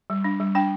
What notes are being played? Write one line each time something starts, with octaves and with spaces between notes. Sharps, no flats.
G3
D4
G3
D4 G5